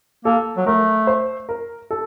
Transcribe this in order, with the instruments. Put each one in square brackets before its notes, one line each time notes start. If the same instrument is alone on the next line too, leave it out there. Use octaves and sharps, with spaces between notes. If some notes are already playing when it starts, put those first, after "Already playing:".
[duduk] A#3 [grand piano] A4
[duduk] F#3
[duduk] A3 [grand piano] A#4
[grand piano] C5
A#4
A4